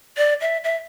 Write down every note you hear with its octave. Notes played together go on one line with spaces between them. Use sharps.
D5
E5
E5